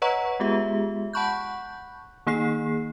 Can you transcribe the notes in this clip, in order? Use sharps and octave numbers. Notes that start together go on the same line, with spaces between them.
B4 C#5 D#5 F#5 A#5 C#6
G#3 B3 F4 G4 G#4 E5
F#5 A5 B5 C#6 F#6 G6
D#3 A#3 D#4 G#4 C7